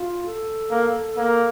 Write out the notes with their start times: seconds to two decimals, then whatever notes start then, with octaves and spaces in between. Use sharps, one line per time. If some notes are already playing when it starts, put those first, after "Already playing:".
Already playing: F4
0.26 A4
0.71 A#3
1.17 A#3